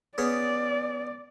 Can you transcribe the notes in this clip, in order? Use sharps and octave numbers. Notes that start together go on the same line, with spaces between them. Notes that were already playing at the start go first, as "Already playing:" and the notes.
B3 C#4 G#4 D5